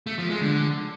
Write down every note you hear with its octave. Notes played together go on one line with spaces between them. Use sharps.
A3
F3
G#3
D3